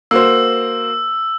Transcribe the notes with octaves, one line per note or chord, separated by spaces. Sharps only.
A#3 F#4 C5 E6